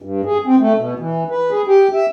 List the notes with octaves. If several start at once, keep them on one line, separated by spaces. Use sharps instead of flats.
G2
G#4
C4
A3
B2
E3
B4
G#4
G4
E5